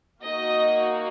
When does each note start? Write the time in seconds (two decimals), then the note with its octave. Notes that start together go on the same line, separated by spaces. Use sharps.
0.23 A#3 D#4 F#4 D#5